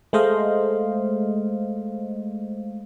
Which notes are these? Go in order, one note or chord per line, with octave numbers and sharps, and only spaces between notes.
G#3 A3 C5 D#5 F5